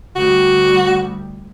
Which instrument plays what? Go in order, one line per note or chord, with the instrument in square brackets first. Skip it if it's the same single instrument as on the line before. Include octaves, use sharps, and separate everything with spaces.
[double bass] D2 G3 [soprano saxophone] F#4